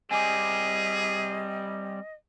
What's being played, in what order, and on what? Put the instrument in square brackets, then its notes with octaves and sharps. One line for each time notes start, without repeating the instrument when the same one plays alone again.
[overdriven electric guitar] G3 C4 [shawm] G#4 [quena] D#5 [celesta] G#5 D6